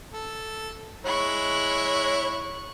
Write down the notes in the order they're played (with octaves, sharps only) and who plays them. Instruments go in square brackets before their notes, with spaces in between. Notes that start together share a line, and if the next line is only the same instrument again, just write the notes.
[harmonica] A4
[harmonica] G#3 E4 [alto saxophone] C#5 [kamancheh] C#6 F#6